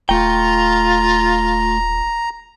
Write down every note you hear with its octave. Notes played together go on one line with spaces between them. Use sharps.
D#1 A3 F4 G5 A#5